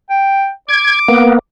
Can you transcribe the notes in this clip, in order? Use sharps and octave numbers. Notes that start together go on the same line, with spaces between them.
G5
D6 G#6
A#3 B3